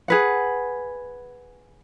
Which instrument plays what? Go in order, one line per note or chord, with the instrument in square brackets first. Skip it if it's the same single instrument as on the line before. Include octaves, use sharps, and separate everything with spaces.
[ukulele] G#4 B4 F#5